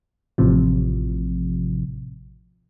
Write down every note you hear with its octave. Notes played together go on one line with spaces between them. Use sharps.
A1 A2 C3 F3